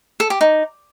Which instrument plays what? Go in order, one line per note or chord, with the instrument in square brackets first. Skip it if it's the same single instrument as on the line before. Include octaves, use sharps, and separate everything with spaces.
[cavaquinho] A4
G4
D#4